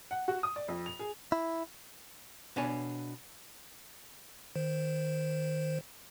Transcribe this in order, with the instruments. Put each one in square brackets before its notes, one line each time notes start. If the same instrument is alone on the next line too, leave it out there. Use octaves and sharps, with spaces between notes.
[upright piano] F#5
F#4
D#6
D5
F2
F7
G#4
[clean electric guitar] E4
[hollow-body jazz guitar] B2 D4 C#5 G#5
[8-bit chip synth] D#3 C5